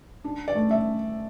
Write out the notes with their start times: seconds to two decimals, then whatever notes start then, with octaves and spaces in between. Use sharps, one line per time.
0.24 D4
0.48 D5
0.55 A3
0.71 E5